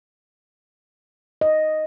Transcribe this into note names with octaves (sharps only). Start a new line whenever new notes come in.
D#5